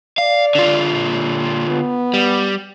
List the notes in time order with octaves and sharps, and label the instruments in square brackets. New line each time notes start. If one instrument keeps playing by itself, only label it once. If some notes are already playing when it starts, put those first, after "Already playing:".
[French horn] D5 [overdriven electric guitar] F5
[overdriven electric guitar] D3 F4
[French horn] A#2
B3
[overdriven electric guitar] G3